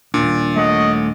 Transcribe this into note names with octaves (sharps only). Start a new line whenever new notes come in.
D#1 A#2 D4
A3 C#5 D#5 F#5